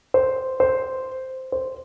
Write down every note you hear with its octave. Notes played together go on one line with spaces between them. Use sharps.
C5
C5
C5